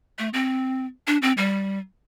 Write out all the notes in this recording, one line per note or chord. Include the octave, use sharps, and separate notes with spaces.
A3
C4
D4
C4
G3